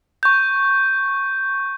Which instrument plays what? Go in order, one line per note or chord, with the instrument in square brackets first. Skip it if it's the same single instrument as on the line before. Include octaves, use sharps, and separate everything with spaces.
[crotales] C#6 G6